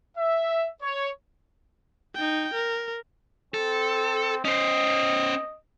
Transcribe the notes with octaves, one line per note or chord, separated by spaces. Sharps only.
E5
C#5
D#4 G5
A#4
C4 A4
C#4 C5 D#5